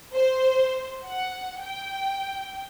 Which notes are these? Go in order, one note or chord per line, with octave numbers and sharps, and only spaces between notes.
C5
F#5
G5